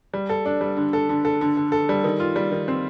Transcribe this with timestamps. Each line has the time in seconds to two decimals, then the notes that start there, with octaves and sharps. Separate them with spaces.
0.13 G3
0.29 A4
0.45 D4
0.61 G3
0.77 D3
0.93 A4
1.09 D3
1.25 A4
1.41 D3
1.57 D3
1.72 A4
1.89 G3
2.04 D#3
2.20 F4
2.36 G3
2.52 D#3
2.68 C4